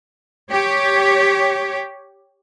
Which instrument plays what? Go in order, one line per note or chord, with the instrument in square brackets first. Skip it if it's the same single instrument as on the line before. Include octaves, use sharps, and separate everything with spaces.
[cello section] G4 C#5